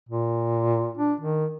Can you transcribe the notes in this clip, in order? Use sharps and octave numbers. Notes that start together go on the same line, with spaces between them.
A#2
D4
D#3